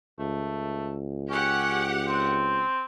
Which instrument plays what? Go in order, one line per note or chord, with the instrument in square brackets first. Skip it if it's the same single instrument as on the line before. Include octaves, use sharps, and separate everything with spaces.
[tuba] C#2 [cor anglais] A3
[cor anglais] C#4 [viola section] G4 F#5
[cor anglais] C4